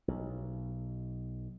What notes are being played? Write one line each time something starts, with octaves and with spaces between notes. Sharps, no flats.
B1